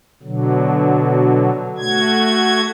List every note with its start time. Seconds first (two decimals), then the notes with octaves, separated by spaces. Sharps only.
0.23 B2 D3 F#3
1.78 A3 F#4 G#6